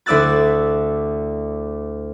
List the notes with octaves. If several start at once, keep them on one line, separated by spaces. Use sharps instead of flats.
D2 E4 D5 E6 F#6 A6